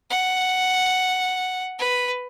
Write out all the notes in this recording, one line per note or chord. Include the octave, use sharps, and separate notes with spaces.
F#5
B4